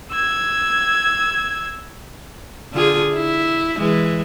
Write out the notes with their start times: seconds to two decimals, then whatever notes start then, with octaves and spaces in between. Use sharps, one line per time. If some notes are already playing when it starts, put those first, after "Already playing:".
0.12 E6 G#6
2.72 D3 F4 G#4
3.14 E4
3.77 E3 G#3